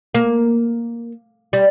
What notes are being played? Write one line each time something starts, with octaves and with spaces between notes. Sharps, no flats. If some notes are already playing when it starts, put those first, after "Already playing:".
A#3
G3